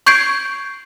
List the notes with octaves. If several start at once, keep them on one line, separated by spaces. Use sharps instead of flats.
C#6 G6 G#6 C7 D7